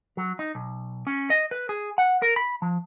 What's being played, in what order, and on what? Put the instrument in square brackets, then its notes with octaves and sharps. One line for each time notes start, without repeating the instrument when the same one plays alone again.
[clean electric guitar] F#3
D#4
B1
C#4
D#5
B4
G#4
F#5
A#4
B5
F3